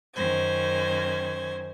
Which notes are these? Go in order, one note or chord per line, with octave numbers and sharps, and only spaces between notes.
F#2 D#3 C#4 C5 G#6